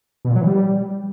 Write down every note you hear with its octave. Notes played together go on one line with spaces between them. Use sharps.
B2
A#2
F#3
E3
G3